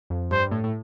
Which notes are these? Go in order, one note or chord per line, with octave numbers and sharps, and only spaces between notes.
F2
G2 C5
A2
A2